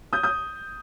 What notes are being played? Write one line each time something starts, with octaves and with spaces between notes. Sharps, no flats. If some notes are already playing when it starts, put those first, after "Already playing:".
D#6 G6
D#6 G6